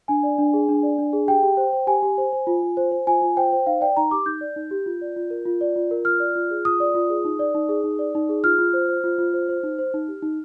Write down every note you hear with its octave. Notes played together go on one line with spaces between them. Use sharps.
D4 G#5
D5
D4
G#4
D4
D5
D4
G#4
G4 G5
G4
C5
C5
G4 G#5
G4
C5
C5
F4
F4
C5
C5
F4 G#5
F4
C5 G5
C5
D#4 F5
D5 G5
D#4 A#5
G4 D6
D#4 G6
D5
D#4
G4
F4
D5
F4
A#4
F4
D5
F4
A#4
F4 F6
D5
F4
G#4
F4 D#6
D5
F4
G#4
D#4
D5
D#4
G#4
D#4
D5
D#4
G#4
F4 F6
F4
C5
C5
F4
F4
C5
C5
D#4
C5
D#4
G4
D#4